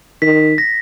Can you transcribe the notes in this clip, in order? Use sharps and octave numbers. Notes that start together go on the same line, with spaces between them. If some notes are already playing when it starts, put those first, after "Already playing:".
D#3 B6
A#6